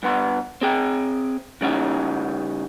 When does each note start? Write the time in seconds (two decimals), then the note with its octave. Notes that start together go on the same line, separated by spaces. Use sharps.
0.03 G2 B3 C6
0.61 C4 G#4 G5
1.61 C#3 G3 C#4 D#4